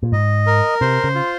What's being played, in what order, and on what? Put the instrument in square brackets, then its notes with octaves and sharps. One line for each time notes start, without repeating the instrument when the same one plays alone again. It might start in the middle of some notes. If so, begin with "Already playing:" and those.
[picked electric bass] A#2
[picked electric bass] G#2 [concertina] D#5
[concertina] A#4
[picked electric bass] C3 [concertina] C5
[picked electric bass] C#3
[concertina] F4